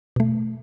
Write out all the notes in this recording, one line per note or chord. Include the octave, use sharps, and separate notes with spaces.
B2 A3